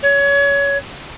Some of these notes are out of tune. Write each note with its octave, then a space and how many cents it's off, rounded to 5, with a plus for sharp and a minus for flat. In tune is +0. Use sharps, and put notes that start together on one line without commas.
C#5 +25